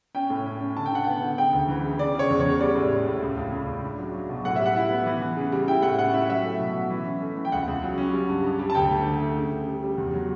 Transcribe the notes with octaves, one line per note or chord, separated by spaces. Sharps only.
C#4 G5
A2
C#4
C#4
D3 A5
G5
D3 F#5
B3 G5
D3
C#3 G5
D2
E3
C#3
C#3 D5
C#3 C#5
E2
C#5
C#3
G3 D5
A2
A2
A2
C#2
C#2
C#2
C#2
D4
F#3
F#3
B2
A2 F#5
G3 E5
F#5
E4
B3
E3
E3
C#3
G3
E4 G5
A2 F#5
C#4 F#5
E4 E5
F#3 E5
A3
B2
F#3
E3
C#4
A3
E3
G5
C#2 F#5
C#2
F#3
C#4
G3
G2
G2
G3
A5
D2 G5
A3
D3
A3
C#3
C#3
G3
G3
E2
F#3